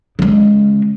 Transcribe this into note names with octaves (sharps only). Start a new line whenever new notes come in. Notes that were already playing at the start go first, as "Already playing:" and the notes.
C#3 G#3